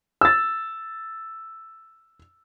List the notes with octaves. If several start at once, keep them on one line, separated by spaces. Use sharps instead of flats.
E6 A6